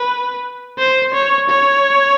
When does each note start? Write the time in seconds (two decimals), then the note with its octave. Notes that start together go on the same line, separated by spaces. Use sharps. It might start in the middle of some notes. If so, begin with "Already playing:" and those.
Already playing: B4
0.78 C5
1.14 C#5
1.49 C#5